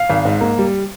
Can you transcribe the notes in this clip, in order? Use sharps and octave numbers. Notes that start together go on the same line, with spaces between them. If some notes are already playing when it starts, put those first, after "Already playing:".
Already playing: F5
G#1
G#2
A#3
G3